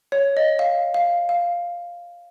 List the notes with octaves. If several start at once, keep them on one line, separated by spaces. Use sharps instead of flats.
C#5
D#5
F5
F5
F5